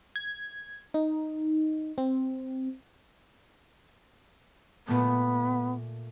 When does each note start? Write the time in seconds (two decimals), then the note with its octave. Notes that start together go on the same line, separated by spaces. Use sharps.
0.16 G#6
0.94 D#4
1.98 C4
4.88 A#2 A3 B3